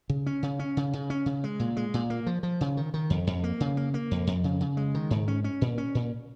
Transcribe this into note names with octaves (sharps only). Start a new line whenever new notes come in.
C#3
C#4
C#3
C#4
C#3
C#3
C#4
C#3
G#3
A#2
G#3
A#2
A#3
F3
F3
C#3
D#3
D#3
F2
F2
A#3
C#3
A#3
A#3
F2
F2
C#3
C#3
G#3
D#3
G#2
C#4
C#4
A#2
C#4
A#2